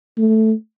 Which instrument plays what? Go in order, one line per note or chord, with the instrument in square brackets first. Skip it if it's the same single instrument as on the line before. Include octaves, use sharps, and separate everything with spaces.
[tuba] A3